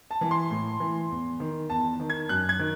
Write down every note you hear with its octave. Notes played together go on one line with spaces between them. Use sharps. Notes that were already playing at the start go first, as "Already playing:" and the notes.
A5
E3
C6
A2
E3
E2
D#3
E2 A5
D#3
G#6
F#2 F#6
G#6
D#3